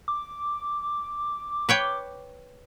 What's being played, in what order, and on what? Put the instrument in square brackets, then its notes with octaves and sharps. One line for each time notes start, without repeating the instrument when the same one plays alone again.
[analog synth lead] D6
[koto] B4 C#5 G5